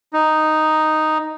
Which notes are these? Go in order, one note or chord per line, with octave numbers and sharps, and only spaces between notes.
D#4